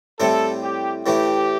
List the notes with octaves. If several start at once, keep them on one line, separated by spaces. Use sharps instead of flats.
A2 G3 C4 E4 A4
G4
A2 E3 A3 E4 G4